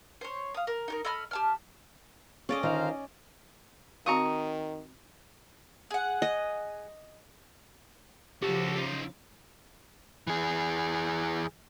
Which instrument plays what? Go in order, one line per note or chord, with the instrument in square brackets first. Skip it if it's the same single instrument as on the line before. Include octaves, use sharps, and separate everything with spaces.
[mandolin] C5 C#5
F5 D#6
A#4
D#4 G4 A#4
A4 D#5 B5 F6
G4 A5 F6
[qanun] C#4 D5 D#5 [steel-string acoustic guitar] G#4 A4 F5
[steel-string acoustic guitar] D3 D#3 F4 [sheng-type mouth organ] C5 F5 A#5
[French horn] D#3 [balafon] C4 F#4 F5 [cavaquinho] A#5 C#6 D#6
[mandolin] G#4 F#5
[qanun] D#5
[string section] C#3 F3 [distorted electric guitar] F#4 A4 [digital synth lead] G4
[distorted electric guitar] D#4 F4
[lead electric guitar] E3 G#4